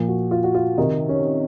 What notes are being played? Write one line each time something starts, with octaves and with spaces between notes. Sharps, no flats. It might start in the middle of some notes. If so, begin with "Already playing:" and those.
Already playing: A#2 F3
F#4
F4
F#4
F4
C3 D#3 D#4
C#4